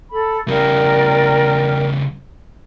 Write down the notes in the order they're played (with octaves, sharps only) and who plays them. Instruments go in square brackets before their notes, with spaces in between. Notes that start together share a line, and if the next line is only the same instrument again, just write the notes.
[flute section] A4 B5
[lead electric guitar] C#3 G3 [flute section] A#4 D5 G5